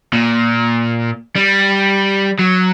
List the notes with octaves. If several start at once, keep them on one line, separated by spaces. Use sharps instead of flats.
A#2
G3
F#3